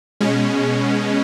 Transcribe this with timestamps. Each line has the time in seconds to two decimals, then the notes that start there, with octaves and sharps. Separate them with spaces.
0.21 B2 G#3 C#4